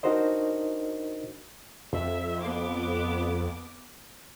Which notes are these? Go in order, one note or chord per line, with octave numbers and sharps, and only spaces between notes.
D4 D#4 F#4 A#4 C5 D#5
F2 E5
B3 D6